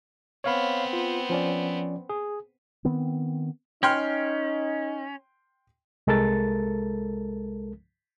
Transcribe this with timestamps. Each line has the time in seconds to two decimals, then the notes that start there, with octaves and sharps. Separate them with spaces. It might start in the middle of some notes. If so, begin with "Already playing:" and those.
0.44 B3 C4 C#5 F5 B5
0.93 F4
1.30 F3 C#4 D5
2.10 G#4
2.85 D#3 B3 C4
3.83 C#4 D#4 G5 C6 F6
6.07 C2 G#3 A4 A#4 A6